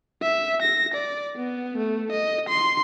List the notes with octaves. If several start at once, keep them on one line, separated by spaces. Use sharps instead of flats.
E5
A#6
D5
B3
A3
D#5
C6